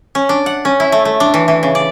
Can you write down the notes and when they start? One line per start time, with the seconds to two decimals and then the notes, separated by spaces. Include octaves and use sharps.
0.15 C#4
0.29 D4
0.46 F#5
0.65 C#4
0.80 E4
0.92 A3
1.05 A3
1.20 D4
1.34 E3
1.48 E3
1.63 C#3
1.75 D5